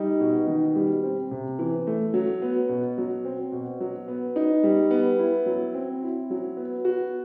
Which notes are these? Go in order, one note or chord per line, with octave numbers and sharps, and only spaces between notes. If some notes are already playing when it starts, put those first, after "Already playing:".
Already playing: G3 D#4
B2
D#3
G3
C4
C3
E3
A3
F#3
B3
B2
F#3
C4
B2
F#3
B3
D#4
G3
B3
E4
F#3
C4
E4
F#3
B3
F#4